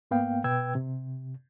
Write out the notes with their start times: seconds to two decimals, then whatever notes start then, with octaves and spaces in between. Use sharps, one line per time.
0.11 G#2 A#3 B3 F5 G5
0.44 B2 B4 G5 E6 G#6
0.75 C3